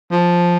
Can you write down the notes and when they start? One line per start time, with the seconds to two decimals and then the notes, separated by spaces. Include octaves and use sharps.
0.12 F3